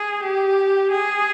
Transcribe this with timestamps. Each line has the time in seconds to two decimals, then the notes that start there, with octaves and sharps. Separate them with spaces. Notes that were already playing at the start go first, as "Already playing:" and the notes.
Already playing: G#4
0.23 G4
0.91 G#4